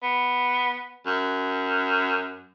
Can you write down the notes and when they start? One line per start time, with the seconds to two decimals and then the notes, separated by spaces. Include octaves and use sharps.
0.03 B3
1.06 F#2